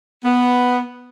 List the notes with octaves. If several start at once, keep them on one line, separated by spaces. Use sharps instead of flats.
B3